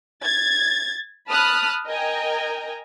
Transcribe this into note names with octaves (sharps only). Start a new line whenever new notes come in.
G#6 A6
A5 B5 D#6 F6 F#6
A#4 D#5 G5 G#5 A#5